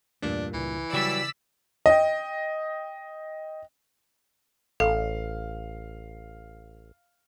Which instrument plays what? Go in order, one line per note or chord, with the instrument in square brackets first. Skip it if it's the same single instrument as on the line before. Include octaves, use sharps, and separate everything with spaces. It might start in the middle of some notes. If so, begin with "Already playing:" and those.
[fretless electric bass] E2 E3 A3 [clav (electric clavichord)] G2 A#2 [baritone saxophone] D4
[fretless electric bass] C#2 C#3 [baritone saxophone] E3
[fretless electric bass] C#3 [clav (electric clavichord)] F#3 G3 F#4 [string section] D5 E6 B6
[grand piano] D#5 G5
[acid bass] A1 [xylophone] A4 [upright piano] F5